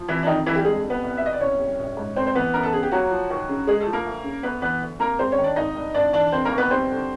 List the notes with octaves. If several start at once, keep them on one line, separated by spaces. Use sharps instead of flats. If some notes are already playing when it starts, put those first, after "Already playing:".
Already playing: F3
C3 E3 E4
D4
F2 D#3 D#4
D3 E3 E4
G3 G4
F2 G#3 G#4
G3
B3 B4
C2
E5
B2 D#5
D5
C2 C#4 C#5
G3
A#1
G#2
A3 C4 C5
C5
E3 B3 B4
F#2 A#4
A4
C#3 G#4
G4
F#3 A#3 F#4
F3
D#2
C#3
G#3 G#4
A3 A4
F3
A#3 A#4
D2
C#3
D2 B3 B4
E3 B3 B4
D2
C3 A#3 A#4
G#3 C4 C5
C#4 C#5
D#3
D4 D5
G#1 D#4 D#5
G2
G#1 D4 D5
E3 D4 D5
F1 C4 C5
A#3 A#4
D#2
B3 B4
G3 C4 C5
D3